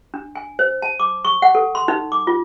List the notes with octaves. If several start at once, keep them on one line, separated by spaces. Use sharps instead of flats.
D4
G#5
C5
A5
D6
C#6
F#5
A4
C6
D#4
D6
F4